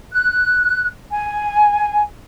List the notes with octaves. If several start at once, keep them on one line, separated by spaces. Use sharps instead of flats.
F#6
G#5